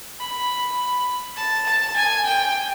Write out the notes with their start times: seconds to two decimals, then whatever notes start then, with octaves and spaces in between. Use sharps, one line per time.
0.20 B5
1.37 A5
1.66 A5
1.96 G#5
2.26 G5